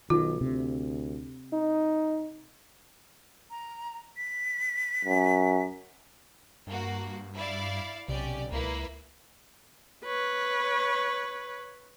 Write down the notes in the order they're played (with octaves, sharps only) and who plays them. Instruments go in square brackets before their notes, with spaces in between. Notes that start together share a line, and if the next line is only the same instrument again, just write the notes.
[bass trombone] B1 [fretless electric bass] D#3 [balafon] F4
[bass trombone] D2 [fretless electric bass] C3
[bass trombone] D#4
[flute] A#5
B6
[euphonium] F#2
[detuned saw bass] G2 [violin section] A#3 F#4
[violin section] E4 D5 F5
[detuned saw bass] B1 [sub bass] C3 [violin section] C#4 G4 D5
[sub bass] C#2 [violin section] A#3 E4 B4
[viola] B4 C#5